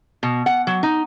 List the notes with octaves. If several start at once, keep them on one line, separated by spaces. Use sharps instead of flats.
B2
F#5
F#3
D#4